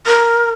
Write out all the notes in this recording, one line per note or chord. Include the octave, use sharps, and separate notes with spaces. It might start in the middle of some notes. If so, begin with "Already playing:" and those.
A#4